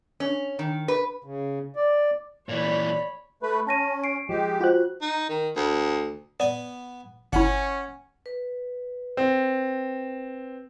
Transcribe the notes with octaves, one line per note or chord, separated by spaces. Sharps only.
C#4
D#3
B4
C#3
D5
A#2 E3 C#5 D5 B5
A3 B4
C#4 A5 A#6 D#7
C7 D7
F3 G#3 G4
F4 F#4 C5 F#6
D#4
D#3
D2
B3 D5 G#5
G1 C#4 E4 F#5
B4
C4